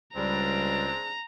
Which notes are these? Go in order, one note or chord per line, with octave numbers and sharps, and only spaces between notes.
C#2 G3 G#3 C4 D4 A#5